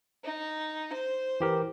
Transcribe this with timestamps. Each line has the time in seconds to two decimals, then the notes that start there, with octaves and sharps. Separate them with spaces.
0.25 D#4
0.93 C5
1.40 E3 G4 A#4